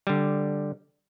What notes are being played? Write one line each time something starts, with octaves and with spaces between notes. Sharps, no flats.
D3 G3